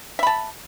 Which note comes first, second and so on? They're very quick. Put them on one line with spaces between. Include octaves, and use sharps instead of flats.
E5 B5 A5